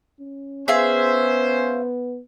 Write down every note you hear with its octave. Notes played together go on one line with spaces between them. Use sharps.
C#4
B3 C#4 G#4 C5 E5 F5